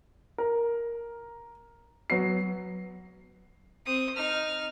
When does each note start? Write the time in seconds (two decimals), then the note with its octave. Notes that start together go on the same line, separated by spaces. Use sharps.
0.38 A#4
2.10 F#3 B3 C7
3.85 C4 D#6
4.16 D#4 F6